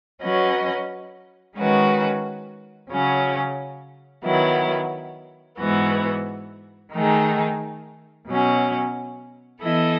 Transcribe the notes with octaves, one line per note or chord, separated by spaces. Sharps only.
F#3 C#4 F#4 B4 D#5
D#3 G#3 C#4 F#4 B4
C#3 F#3 C#4
D#3 F#3 B3 E4
G#2 E3 B3 F#4
D#3 A3 D#4 G#4
B2 F#3 C#4
E3 B3 E4 A4 D#5